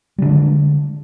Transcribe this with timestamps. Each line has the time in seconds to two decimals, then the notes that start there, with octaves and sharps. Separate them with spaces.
0.18 G3
0.22 D3
0.26 D4
0.29 G#3